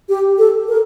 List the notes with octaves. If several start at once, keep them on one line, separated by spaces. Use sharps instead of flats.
G4
A4
A#4